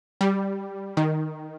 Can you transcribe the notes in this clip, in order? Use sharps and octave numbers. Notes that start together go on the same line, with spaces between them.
G3
D#3